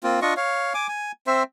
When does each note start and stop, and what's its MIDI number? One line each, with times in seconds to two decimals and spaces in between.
0.03 0.20 58
0.03 0.20 60
0.03 0.20 65
0.22 0.34 62
0.22 0.34 65
0.22 0.34 75
0.22 0.34 85
0.37 0.73 73
0.37 0.73 77
0.74 0.87 80
0.74 0.87 86
0.88 1.12 80
1.27 1.43 60
1.27 1.43 72
1.27 1.43 76